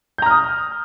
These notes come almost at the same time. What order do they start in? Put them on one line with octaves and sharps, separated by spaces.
G6 A#5 F6 D#6